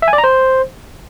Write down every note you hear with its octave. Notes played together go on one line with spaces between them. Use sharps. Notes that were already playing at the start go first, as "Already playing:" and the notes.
E5
G#5
D5
A#5
C5